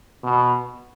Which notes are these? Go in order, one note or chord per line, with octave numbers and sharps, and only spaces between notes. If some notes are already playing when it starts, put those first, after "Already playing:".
B2